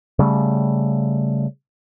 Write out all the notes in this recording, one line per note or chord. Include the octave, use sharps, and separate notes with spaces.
C#3 G3 A3